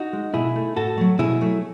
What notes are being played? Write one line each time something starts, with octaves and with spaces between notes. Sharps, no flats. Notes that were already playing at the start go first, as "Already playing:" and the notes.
Already playing: D#4 F#4
G#3
B2 E4 G#4
A3
A2 F#4 A4
F#3 A3
B2 E4 G#4
F#3 A3